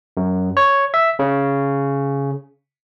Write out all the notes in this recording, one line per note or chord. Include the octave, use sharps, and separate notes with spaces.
F#2
C#5
E5
C#3